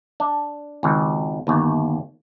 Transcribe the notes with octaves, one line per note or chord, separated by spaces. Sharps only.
D4
G#1 C#2
G1 D#2